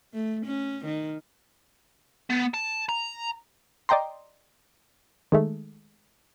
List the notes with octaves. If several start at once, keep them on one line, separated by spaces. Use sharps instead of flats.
A3
C#4
D#3
B3
A5
A#5
D5 D#5 G5 A#5 C6
D#3 G#3 A3